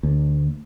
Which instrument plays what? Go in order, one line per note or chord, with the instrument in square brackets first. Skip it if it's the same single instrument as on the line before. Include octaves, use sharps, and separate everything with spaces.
[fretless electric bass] D2